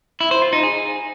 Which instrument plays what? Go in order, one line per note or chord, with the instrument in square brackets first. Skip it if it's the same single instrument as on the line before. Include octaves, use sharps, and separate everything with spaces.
[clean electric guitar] E4
C5
F4
D#4
G#4